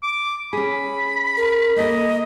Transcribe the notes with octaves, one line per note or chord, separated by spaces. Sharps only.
D6
C#4 G#4 B5
A#4
A#3 A4 A#4 D#5